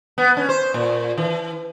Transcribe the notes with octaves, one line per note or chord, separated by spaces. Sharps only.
B3
C#4
C5
A#2
E3